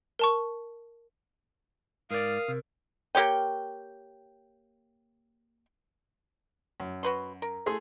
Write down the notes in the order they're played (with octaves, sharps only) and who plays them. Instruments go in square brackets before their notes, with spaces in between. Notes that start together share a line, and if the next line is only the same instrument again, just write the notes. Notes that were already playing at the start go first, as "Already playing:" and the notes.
[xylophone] A#4 A5 C#6
[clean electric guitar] G#2 D5 [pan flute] A#4 [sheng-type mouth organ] F5 D#6
[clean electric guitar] C3
[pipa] A#3 G4 C#5 G5
[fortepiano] F#2
[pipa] F#4 B4 C6
A#4
[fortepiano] A3 G#4 C6